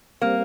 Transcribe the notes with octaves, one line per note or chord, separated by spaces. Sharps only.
G3 A#3 C4